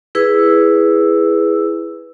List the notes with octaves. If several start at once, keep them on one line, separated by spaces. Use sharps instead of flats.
E4 G#4 B4 E6